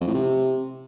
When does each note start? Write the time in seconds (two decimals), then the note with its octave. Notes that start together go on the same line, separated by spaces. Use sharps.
0.01 F2
0.08 A2
0.14 C3